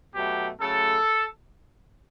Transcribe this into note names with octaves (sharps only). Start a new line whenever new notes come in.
B2 F#3 A3 G4
C#3 F#3 A3 A4